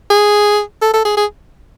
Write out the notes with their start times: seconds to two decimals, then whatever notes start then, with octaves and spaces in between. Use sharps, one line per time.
0.10 G#4
0.82 A4
0.94 A4
1.05 G#4
1.17 G#4